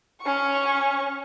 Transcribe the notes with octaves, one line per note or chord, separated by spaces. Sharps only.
C#4 C#6